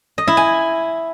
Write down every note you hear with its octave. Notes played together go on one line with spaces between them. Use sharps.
D#5
E4
G#5